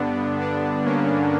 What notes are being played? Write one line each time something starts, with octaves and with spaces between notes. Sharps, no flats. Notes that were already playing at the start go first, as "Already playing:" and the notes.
Already playing: G2 D3 B3 D4
B3 D4
A#3 C#4